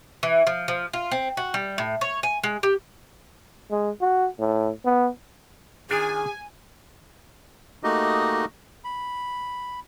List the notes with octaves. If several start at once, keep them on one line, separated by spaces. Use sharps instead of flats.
E3
F3
F3
F4
C4
F#4
G3
A2
C#5
G#5
G#3
G4
G#3
F#4
A2
B3
D#3 D4 F4 G#4 G#5
A3 A#3 D#4 F#4 G4 D#5
B5